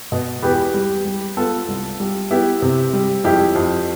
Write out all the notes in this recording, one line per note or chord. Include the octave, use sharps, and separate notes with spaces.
B2
E2 G4 B4
G3
G3
B3 F4 A4
C2
G3
B3 E4 G4
C3
G3
F2 E4 G4
F2